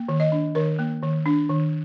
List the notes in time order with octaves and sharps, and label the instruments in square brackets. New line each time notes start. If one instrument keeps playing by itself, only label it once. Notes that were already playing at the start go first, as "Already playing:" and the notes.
Already playing: [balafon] A#3
D#3
D#5
D4
D#3 A#4
A#3
D#3
D4
D#3